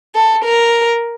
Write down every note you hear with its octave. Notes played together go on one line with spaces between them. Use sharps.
A4
A#4